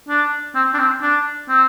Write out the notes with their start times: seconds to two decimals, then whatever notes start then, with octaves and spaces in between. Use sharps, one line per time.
0.08 D4
0.55 C4
0.74 D4
0.79 C4
1.02 D4
1.49 C4